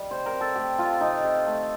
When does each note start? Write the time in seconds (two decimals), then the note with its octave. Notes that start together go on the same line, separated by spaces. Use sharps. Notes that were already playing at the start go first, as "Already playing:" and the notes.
Already playing: G3 D#5
0.11 C3 C5
0.26 A#4
0.33 C3
0.41 A4
0.56 A3 G4
0.78 F3 F4
1.01 C3 D#4
1.23 C3
1.47 A3